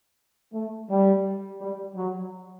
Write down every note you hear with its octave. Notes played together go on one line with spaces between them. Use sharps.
A3
G3
G3
F#3